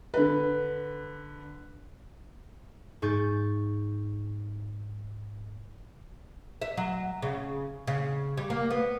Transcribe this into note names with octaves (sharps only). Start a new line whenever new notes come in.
D3 B4
G#2 C#6 G6 A6
E5
F#3
C#3
C#3
G3
A#3
B3